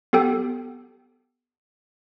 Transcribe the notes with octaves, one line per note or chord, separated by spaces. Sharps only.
B3 G4 A4 G5